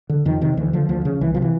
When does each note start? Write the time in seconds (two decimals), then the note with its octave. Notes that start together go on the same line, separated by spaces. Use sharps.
0.09 D3
0.25 F2 D#3
0.41 C3 D#3
0.57 D2 E3
0.73 D3 F3
0.89 D2 F3
1.05 C#3
1.21 C2 E3
1.34 C3 F3
1.42 E3